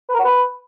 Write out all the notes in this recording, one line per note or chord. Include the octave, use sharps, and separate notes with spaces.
B4
A#4
F#4
B4